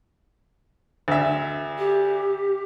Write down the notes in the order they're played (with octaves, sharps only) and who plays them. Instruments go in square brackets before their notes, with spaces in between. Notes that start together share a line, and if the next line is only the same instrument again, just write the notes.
[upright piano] D2 E5
[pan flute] G4